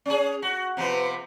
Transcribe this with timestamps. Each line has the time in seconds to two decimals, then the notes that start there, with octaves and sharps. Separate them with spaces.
0.06 C#4 G#4
0.42 F#4
0.77 C3 F3 B3